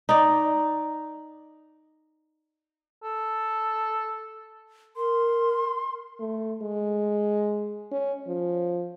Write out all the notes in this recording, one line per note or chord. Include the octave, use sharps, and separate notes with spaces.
D#4 D5
A4
A#4 C6
A3
G#3
C#4
F3